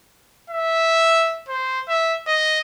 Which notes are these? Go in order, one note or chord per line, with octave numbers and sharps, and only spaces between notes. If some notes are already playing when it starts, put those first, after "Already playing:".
E5
C5
E5
D#5